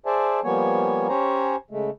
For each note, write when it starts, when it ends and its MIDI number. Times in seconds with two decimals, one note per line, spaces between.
0.06 0.40 68
0.06 0.40 72
0.06 0.40 74
0.06 0.40 76
0.06 0.40 80
0.06 0.40 81
0.44 1.08 53
0.44 1.08 55
0.44 1.08 58
0.44 1.08 59
0.44 1.08 73
0.44 1.08 80
1.09 1.56 61
1.09 1.56 67
1.09 1.56 72
1.09 1.56 73
1.09 1.56 80
1.09 1.56 82
1.71 1.90 49
1.71 1.90 56
1.71 1.90 57